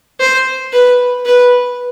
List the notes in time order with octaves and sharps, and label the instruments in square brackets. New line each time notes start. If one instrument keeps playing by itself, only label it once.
[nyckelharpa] C5
B4
B4